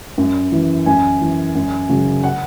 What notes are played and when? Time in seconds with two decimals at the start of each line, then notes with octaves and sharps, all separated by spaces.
0.18 F#2
0.52 E3
0.86 F#2 G#5
1.21 E3
1.55 F#2
1.89 C#3 F#3
2.23 F#5